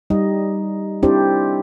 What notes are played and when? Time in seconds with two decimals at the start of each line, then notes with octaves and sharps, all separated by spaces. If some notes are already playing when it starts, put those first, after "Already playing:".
0.10 G3 D#4 D#5
1.03 C4 D4 E4 G4 C5 D5